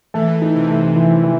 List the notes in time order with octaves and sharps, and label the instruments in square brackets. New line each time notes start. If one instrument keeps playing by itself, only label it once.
[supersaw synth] E3 [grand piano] A3
[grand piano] D#4
[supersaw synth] C3
[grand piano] A3
E3
E3